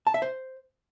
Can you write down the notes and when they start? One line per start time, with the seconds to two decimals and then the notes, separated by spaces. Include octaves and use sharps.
0.07 A5
0.14 E5
0.22 C5